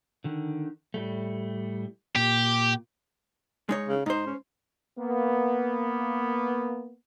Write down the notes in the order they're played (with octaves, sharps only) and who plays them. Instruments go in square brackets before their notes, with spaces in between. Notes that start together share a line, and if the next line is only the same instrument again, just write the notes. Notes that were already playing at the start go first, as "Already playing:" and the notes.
[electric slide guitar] D3 D#3
A2 G3 A3
[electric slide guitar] A#2 [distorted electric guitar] G4
[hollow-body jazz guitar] G#3 D#4 C#5
[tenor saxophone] C#3
[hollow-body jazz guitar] G#2 C5 [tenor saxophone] D#4
[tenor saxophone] C#4
[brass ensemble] A#3 B3